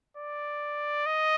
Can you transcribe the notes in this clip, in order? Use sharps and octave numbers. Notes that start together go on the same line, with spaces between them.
D5
D#5